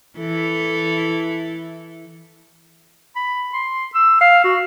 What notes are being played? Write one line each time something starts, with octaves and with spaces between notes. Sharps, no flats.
E3 E4 A4
B5
C6
E6
F5
F#4